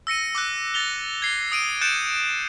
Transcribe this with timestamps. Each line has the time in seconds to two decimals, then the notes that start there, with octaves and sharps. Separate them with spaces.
0.07 E6 A#6 C#7 D#7
0.35 D6 E6 F#6
0.74 A6 A#6 F7 G7
1.22 G#6 C7 G7
1.52 D#6 D7 D#7
1.82 F#6 G6 A6 C#7 D7 E7